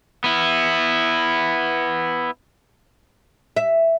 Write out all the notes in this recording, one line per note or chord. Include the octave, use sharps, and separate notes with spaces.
B3 E4
E5